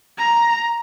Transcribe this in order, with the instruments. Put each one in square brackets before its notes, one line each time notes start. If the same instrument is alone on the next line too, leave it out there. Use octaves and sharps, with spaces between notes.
[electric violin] A#5